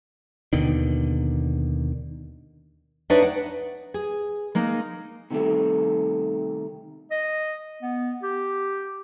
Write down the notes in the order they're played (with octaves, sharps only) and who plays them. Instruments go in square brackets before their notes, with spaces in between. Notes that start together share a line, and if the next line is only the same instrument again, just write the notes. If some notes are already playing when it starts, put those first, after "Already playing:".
[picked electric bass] D#2 B2 D3 D#3
[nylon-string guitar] D4 D#4 B4 C#5 D5 E5
F#5
G#4
G#3 A#3 D#4
[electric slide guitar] C3 D#3 G3 A3
[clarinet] D#5
B3
G4